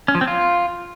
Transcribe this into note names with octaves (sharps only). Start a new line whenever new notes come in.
C#4
F3
C4
F4